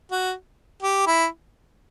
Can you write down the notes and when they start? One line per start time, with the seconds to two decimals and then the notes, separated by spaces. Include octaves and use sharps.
0.11 F#4
0.82 G4
1.06 E4